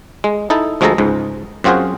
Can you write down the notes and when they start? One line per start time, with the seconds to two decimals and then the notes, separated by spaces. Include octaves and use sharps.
0.24 G#3
0.50 D#4 E4 A4
0.81 D2 F3 G#3 G#4 A4 A#5
0.98 C#2 G#2
1.64 F#2 C4 F4 F#4 G#4 C5